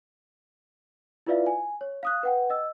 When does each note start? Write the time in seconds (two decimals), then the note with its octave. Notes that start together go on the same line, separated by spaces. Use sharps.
1.26 E4 F4 B4 D5 E5 F5
1.46 G#5
1.81 C#5
2.03 F5 D#6 F#6
2.23 B4 F#5 G5
2.50 D#5 E6